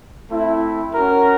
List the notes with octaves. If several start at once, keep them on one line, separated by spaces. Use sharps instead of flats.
A3 C4 E4
C#4 F#4 A#4